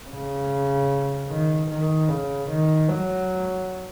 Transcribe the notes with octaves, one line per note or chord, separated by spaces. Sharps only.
C#3
D#3
D#3
C#3
D#3
F#3